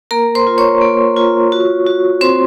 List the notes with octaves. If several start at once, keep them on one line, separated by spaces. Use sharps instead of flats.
A#3 A#4 A#5
C5 C6
F4
C#5 C#6
A#3
F4
F#4
F#4
C4 C5 C6